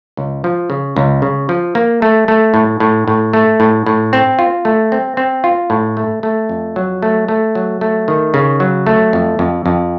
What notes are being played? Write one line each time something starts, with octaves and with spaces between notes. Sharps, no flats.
C#2
F3
C#3
C#2
C#3
F3
A#3
A3
A3
A2
A2
A2
A3
A2
A2
C4
F4
A3
C4
C4
F4
A2
A3
A3
F2
F#3
A3
A3
F#3
A3
D#3
C#3
F#3
A3
F2
F2
F2